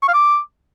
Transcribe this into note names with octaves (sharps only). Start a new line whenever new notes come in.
C#6
F5
D6